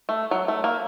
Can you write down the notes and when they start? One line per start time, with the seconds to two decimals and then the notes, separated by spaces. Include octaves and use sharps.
0.09 A3
0.31 F#3
0.48 A3
0.64 A#3